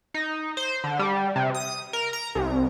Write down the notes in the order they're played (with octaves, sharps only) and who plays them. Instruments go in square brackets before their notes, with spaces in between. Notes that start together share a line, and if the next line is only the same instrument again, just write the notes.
[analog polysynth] D#4
C5
D3
G3
C3
D#6
A#4
A#5
C2